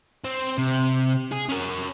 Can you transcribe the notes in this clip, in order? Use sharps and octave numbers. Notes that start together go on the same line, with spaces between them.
C4
C3
G#4
C#4 A#4